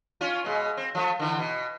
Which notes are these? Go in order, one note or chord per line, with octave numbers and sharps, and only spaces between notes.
C#4 F4
B2 G#3
C4
F3 A3
D3 E3
B2